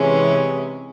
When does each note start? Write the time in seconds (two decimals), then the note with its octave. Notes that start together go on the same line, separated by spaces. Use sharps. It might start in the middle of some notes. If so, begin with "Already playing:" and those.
Already playing: C3 E3 G#3 C#4